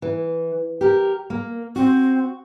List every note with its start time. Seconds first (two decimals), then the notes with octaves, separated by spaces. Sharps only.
0.02 E3
0.81 G4 A#4
1.30 A#3
1.76 C4 F#4